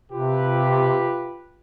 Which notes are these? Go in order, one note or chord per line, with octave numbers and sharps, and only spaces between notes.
C3 F4 G4 B4